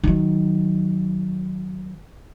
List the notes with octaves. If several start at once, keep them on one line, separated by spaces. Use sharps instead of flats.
D#3 F#3